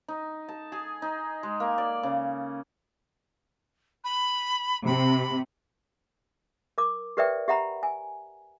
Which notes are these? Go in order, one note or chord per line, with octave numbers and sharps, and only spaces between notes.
D#4
A5
G#4
D#4
G#3
A#3
D5
C#3
B5
C3 B5
A#4 D6
G4 A#4 B4 D5 E5 G5
G4 E5 F#5 A#5 B5
G#5